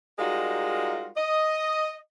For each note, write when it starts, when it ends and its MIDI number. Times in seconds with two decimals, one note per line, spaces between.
0.19 1.10 55
0.19 1.10 56
0.19 1.10 63
0.19 1.10 65
0.19 1.10 66
0.19 1.10 70
1.17 1.97 75